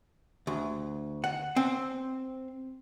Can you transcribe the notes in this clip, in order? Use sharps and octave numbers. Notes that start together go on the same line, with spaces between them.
D2
F#5
C4